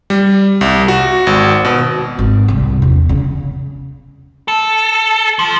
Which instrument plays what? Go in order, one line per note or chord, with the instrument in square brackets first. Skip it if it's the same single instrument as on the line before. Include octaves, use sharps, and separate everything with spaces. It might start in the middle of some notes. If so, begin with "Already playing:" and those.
[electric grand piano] G3
C2
F#4
G#1
B2
[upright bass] G#1
C2
E2
C#3
[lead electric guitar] A4
F3